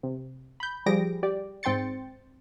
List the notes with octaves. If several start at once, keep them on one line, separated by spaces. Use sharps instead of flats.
C3
B5 G6
F3 G3 G4 G#4 A#6 D7
G4 D5
G#2 C4 G5 C6 A6 C#7